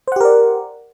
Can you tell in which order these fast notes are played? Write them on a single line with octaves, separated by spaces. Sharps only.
C5 F#5 G4 A#4 D5